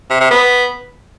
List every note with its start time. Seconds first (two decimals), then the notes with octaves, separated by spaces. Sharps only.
0.10 C3
0.21 C3
0.31 B3